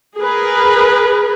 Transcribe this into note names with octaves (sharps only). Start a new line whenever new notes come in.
G#4 A#4 B4